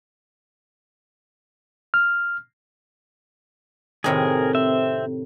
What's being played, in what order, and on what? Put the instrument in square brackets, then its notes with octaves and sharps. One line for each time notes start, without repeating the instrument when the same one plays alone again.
[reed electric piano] F6
[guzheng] A2 C3 D#3 [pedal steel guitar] G#4 A#4
[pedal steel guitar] C4 E5